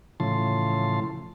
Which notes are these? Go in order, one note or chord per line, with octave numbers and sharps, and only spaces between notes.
A2 C#3 E3 F3 A5 C6